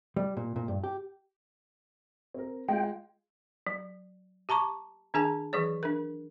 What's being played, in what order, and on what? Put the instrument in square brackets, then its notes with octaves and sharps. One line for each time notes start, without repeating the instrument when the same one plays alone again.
[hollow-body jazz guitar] G3
A#2
A#2
G2
G4
[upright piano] C4 A#4
[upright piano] G#3 F4 [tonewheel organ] G5
[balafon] F#3
G4 A5 A#5 C#6 D6
D#3 D4 G#4 G#5 A5
E3 F#3 G#4 C#5
D4 A#4